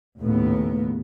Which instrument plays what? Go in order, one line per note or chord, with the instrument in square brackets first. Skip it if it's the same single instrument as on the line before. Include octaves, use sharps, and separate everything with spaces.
[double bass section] D#2 A2 C#3 B3